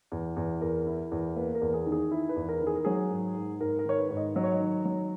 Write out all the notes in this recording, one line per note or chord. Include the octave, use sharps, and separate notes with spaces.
E2
E2
E2 A#4
E4
E2
A#3 B4
A#4
E2
G#4
D#3
G#4
E4
B4
E2
A#4
D#3
G#4
A#4
F#3 G#4
G#2
G#2
G#2 A#4
A#4
D#3 C#5
B4
G#2
D#5
F#3 D#5
C#5
D#5
D#3
F#3